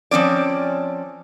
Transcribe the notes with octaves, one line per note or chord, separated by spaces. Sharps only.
F3 C4 C#4 D5